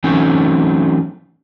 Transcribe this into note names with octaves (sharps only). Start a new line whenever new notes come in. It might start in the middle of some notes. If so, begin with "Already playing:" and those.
E3 F#3 A3 C4 C#4 D#4